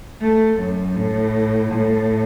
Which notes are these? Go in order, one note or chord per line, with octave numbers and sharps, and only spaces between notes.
A3
F#2
A2
A2